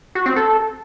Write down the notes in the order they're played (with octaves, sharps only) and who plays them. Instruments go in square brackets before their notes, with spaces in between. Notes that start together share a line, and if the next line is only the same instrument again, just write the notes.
[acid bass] F#4
C4
A4